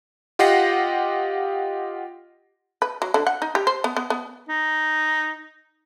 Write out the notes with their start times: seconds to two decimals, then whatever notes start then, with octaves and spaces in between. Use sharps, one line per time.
0.39 F4 G4 D#5 F#5 A#6 C7
2.82 B4
3.02 F#3
3.14 D3
3.27 F#5
3.42 D#4
3.55 G4
3.67 C5
3.84 B3
3.97 B3
4.10 B3
4.49 D#4